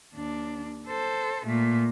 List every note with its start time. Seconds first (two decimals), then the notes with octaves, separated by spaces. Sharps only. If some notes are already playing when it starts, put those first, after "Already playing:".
0.15 D#2 D4
0.88 A4 C5
1.46 A#2 A3